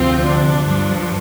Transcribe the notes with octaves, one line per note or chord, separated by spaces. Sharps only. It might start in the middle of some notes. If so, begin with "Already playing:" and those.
Already playing: D2 C3 F3 C4 F4
D4
G2 F3